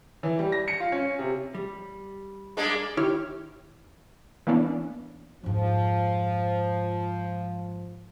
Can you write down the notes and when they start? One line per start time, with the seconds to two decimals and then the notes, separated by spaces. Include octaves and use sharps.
0.23 E3
0.39 G3
0.52 A#6
0.68 C#7
0.80 F4
0.92 C#4
1.19 C3
1.55 G3
2.57 G#3 A#3 D4
2.97 D#3 E4 G4 C#5 F6
4.47 E3 A#3 B3 C#4 D4
5.44 F2 G#2 F3